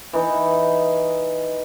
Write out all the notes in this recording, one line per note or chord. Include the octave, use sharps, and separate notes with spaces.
E3 D#4